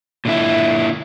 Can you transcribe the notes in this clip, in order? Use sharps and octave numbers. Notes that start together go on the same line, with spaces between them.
A#2 D3 E4